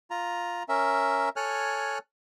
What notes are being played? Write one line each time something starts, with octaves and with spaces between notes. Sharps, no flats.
F4 A#5
C#4 A#4 E5
A4 C#5 G#5 F6 F#6